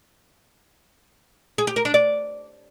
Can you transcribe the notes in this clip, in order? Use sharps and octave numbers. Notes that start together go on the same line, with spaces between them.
G#4
G4
A#4
D4
D5